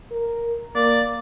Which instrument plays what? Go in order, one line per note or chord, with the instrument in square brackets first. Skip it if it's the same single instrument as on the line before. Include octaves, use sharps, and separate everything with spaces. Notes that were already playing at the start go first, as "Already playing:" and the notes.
[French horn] A#4
[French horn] A#3 [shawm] D5